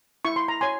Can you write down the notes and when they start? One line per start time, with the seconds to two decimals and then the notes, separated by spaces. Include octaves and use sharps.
0.25 E4 C#6
0.36 C6
0.48 A#5
0.61 C#5 G#5 C6